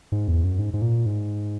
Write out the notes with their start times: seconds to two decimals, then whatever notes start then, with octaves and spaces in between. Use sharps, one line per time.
0.12 G#2
0.28 E2
0.44 F#2
0.59 G#2
0.74 G#2
0.82 A#2
1.06 G#2